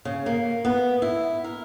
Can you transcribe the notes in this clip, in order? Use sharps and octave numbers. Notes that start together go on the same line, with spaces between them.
C#3
A#3
B3
E4
A#4